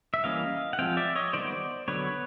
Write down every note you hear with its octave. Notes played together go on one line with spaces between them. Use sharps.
E5
E3 G3 A#3 C#4 D#5 F5
F#5
F3 G#3 C4 F5 G5
D5 E5
C#5 D#5
D#3 G3 B3 C5 D5
D3 F#3 B3 B4 C#5